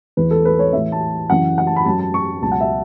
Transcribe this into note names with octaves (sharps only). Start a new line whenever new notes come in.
E2 E3 B4
A4
B4
C#5
A2 E3 E5
A5
F#2 C#3 E3 F#5
F#5
A5
B5
F#2 F#3 A5
A5
C#6
C#2 B2 F#3 A5
F#5
E5